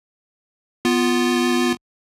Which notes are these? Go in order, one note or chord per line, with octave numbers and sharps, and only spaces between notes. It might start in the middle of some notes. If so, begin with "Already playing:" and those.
B3 F4